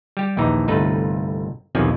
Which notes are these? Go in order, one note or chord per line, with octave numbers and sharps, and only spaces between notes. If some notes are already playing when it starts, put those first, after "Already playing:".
G3 G4
A#1 D#2 E3 D#4 A#5
G1 C2 A3 D#4 B4
B1 E2 C3 D#3 F3 G#5